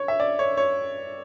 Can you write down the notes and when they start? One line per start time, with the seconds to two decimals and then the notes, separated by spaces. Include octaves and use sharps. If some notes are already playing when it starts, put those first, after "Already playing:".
Already playing: C#5
0.08 E5
0.20 D5
0.39 C#5
0.57 C#5